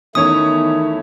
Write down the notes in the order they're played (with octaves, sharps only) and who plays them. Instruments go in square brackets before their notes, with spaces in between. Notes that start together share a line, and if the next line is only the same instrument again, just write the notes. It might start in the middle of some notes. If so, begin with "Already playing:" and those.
[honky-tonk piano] E2 C#4 C#5 [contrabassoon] D#3 [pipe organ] A3 E4 [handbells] D#6